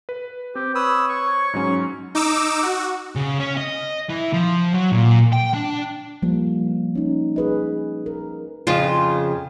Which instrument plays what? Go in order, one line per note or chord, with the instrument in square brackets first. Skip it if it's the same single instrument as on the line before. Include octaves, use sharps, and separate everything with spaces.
[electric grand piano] B4
[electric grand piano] C4 [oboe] G4
[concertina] B4 D#6 E6 [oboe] C#5
[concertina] C#6
[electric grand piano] G#2 F#3 C#4
[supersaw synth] D#4 D6 E6
F#4
[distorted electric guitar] C#3
C#4
D#5
E3
F3
F#3
A#2
G5
D4
[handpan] F3 G3 A#3
C#4 D#4
G#4 B4 D#5
A#4
[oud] F2 C#3 F4